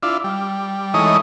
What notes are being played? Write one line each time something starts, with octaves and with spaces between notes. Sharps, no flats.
D4 E4 F4
G3
E3 G#3 A3 D#4 C#5 D#5